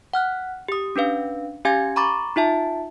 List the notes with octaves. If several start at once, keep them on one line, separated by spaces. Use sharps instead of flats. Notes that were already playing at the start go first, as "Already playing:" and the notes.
F#5 F6 F#6
G4 D#6
C#4 D4 B4 F5
C#4 G4 F5 G#5 G#6
A#5 B5 C#6 D6 A6
D#4 F4 E5 A5